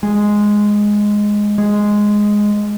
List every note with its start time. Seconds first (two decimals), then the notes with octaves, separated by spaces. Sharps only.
0.03 G#3
1.58 G#3